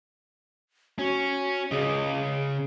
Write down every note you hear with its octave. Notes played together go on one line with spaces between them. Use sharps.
C#4 F#4
C#3 G#4 D#5